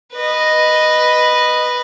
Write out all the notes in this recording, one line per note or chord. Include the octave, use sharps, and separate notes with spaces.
B4 D#5